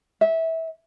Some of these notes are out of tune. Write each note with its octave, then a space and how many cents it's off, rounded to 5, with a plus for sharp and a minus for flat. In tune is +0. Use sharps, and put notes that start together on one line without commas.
E5 -20